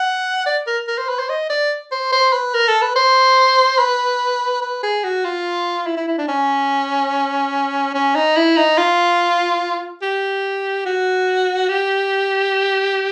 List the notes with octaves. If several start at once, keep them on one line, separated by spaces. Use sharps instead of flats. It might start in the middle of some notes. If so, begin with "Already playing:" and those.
Already playing: F#5
D5
A#4
A#4
C5
B4
C5
D#5
D5
C5
C5
B4
A#4
A4
B4
C5
B4
B4
G#4
F#4
F4
E4
E4
E4
D4
C#4
C#4
D#4
E4
D#4
F4
G4
F#4
G4